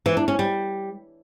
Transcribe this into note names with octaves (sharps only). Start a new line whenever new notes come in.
E3
D4
C#4
G3